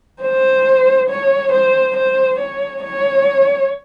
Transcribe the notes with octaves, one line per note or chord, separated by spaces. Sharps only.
C5
C#5
C5
C5
C#5
C#5